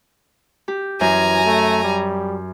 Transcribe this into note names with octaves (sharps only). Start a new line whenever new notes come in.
G4
F#2 E3 G#5 A#5
A3
G3